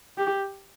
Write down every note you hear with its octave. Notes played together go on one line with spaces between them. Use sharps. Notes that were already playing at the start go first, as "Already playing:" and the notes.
G4